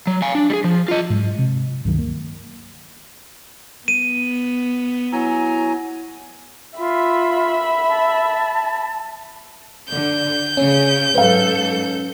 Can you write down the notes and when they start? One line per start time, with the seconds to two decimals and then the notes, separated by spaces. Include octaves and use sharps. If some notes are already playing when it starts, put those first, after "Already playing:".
0.07 F#3
0.22 F5 G#5
0.35 D4
0.50 G3 G#4
0.64 F3
0.88 F4 D#5
1.10 G#2 F#3 G#3
1.38 C3
1.85 C#2 G2 D#3 F#3
1.98 A#3
3.88 B3 D#7
5.12 F#3 E4 G#5 A#5
6.78 F4 E5 B5
7.89 A5
9.89 D3 G6
10.57 C#3 C#4
11.15 G#2 F#3 A4 B4 F5